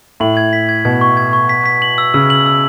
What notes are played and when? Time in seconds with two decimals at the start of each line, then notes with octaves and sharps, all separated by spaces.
0.20 A2 F#7
0.37 G#6
0.53 B6
0.69 G#6
0.85 B2 G#6
1.01 C#6
1.17 G#6
1.33 C#6
1.49 B6
1.66 B6
1.82 F#7
1.98 E6
2.14 C#3 E6
2.30 F#7
2.46 E6